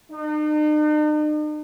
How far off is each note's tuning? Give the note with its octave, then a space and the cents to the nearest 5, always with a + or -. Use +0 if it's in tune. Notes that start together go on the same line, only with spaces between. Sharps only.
D#4 -45